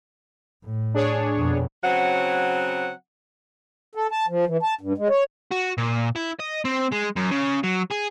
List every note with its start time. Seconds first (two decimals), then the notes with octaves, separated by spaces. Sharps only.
0.65 A2
0.94 D4 G#4 C#5
1.37 F2 B2
1.84 C#3 F#3 C4 F#5
3.95 A4
4.11 A5
4.28 F3
4.47 E3
4.63 A5
4.81 G2
4.98 G#3
5.09 C#5
5.51 F#4
5.78 A#2
6.16 E4
6.39 D#5
6.65 C4
6.92 G#3
7.17 F#2
7.31 C#3
7.64 F#3
7.91 G#4